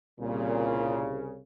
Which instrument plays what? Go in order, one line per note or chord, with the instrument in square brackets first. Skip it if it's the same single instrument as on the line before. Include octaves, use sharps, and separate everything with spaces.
[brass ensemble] C2 C#3 [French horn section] A#2